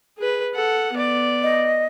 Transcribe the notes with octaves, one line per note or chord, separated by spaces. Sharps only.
G#4 B4
A4 F#5
B3 D5
D#5